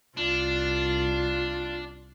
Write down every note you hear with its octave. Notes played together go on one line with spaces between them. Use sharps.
C2 D4 F4